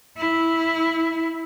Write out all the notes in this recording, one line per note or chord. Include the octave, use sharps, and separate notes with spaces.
E4